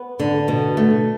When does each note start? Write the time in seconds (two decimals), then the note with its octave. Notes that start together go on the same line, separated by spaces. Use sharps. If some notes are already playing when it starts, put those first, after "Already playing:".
Already playing: B3
0.20 D3
0.48 B2
0.77 A3